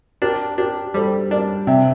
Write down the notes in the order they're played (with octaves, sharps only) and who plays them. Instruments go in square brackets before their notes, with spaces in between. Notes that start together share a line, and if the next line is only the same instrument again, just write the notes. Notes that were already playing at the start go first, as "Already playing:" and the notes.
[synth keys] D4 [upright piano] G4 A#4
[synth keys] D4 [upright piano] G4 A#4
[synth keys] G3 [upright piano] A4 C5
[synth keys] D4 [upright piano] A#4 D5
[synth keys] C3 [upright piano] E5 G5